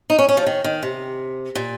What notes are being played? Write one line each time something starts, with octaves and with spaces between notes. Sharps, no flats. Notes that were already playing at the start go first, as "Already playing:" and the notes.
D#4
C#4
C#4
F3
D#3
D#3
C3
A#2